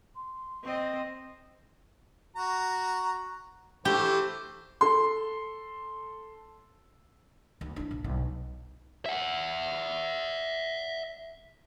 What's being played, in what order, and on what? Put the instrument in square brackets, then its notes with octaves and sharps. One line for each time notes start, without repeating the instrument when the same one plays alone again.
[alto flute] C6
[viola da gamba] C4 D#5
[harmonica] F#4 A#5
[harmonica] E3 A3 C5 [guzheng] G4
[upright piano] A4 C6
[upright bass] D2
D4 E4
A#1
B1
[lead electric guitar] E5 F#5